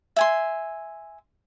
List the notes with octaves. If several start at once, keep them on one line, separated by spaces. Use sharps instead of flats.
E5 G#5 C6